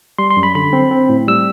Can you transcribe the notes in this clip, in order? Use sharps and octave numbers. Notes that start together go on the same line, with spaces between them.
G3 C6
C6
F#2
B5
D3 B5
C4
C4
A2
G3 E6